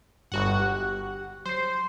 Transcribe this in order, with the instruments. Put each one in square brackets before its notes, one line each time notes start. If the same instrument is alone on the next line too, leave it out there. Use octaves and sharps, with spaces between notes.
[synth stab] G1 F#4 F#5 [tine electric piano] G2 G3
[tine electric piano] G4 F#6
[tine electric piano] F#3 C7 [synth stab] C5